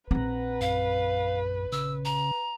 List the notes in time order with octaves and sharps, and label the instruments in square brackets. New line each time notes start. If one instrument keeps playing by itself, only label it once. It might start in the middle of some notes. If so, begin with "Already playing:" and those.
[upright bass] A#1 C4 [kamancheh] B4 [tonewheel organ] F#5 A#5
[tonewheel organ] F#2 [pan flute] F5
[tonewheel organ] C#3 [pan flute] E6
[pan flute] A#5